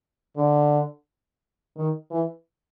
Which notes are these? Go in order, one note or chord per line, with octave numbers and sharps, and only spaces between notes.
D3
D#3
E3